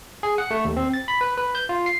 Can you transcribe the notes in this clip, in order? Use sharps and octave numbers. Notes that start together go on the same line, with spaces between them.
G#4
F#5
A3
D#2
C4
A6
B5
B4
B4
G6
F4
C7